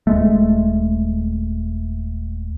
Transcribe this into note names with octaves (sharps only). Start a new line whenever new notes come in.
D#1 G#3 A3